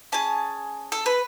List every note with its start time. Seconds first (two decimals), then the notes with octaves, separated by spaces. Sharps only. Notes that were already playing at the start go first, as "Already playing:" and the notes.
0.12 C#4 G#4 A5
0.92 A4
1.06 B4